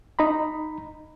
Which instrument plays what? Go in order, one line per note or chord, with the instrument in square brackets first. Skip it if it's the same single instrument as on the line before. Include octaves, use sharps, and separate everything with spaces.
[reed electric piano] D#4 A#5 B5